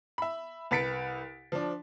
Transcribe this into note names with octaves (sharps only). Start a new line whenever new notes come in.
E5 B5
C2 B4 A6 B6 C#7 D7
F3 D4